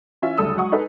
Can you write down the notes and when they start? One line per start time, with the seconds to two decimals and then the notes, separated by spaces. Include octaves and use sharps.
0.22 E3 C#4 F4 E5
0.37 F#1 D2 G3 A4 D#6 E6
0.57 F#3 G#3 F#5 C#6 D#6
0.72 D#4 G#4 A4 B4